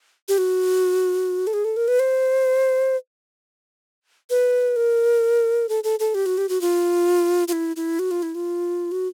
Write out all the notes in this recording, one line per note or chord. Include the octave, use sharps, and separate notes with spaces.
G4
F#4
A4
G#4
A4
A#4
B4
C5
B4
A#4
A4
A4
A4
G4
F#4
G4
F#4
F4
F4
E4
E4
F#4
F4
E4
F4
F#4